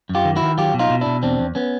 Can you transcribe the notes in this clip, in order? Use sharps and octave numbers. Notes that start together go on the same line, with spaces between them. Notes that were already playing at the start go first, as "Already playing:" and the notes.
F#2
F4 G4
D#3
E4 F#4
D#3
F#3 F4 G4
B2
D#4 F4
B2
B2 D4 E4
E2 C4 D4
E2
B3 C#4